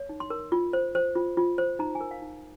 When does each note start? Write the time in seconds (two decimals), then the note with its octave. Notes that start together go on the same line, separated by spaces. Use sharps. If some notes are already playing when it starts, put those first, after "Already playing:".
Already playing: C#5
0.09 D#4
0.20 C6
0.30 A#4
0.52 F4
0.73 C5
0.95 C5
1.16 F4
1.37 F4
1.58 C5
1.79 D#4 A#5
1.95 G#5
2.01 A#4
2.11 F5
2.22 D#4